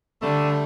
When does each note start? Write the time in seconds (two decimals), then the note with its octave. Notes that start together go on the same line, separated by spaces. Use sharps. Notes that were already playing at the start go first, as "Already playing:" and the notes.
0.22 D3 G3 A3